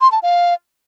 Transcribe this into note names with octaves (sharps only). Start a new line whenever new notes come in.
C6
A5
F5